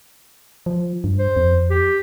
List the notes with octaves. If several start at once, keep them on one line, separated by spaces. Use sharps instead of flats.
F3
G2
C5
F2
G4